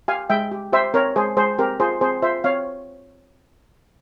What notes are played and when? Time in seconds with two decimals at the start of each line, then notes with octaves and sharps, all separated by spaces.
0.08 G4 F5 G#5
0.30 G#3 E5 G5
0.52 G4
0.73 G4 C5 E5
0.94 C4 A#4 C#5
1.16 G#3 G#4 C5
1.37 G#3 G#4 C5
1.58 C4 G4 A#4
1.80 F4 G#4 C5
2.01 C4 G#4 C5
2.22 F4 C5 E5
2.44 C4 C#5 F5